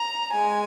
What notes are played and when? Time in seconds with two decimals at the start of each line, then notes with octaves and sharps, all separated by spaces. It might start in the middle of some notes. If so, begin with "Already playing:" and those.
Already playing: A#5
0.32 G#3 G#5